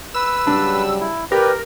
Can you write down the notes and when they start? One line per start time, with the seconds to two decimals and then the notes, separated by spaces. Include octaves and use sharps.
0.14 B4 E6
0.47 C#3 F#3 G3 D4
1.00 E4
1.32 G4 A#4 B4 D5 G5